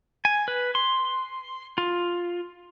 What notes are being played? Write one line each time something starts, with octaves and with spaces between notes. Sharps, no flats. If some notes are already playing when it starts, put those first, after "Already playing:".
G#5
B4
C6
F4